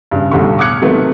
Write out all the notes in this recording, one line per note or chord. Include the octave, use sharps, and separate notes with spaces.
G2 C#3
B1 A2 D3 G3 C#6
D6 D#6 F6 F#6 G#6 C#7
C3 D#3 F#3 A3 B3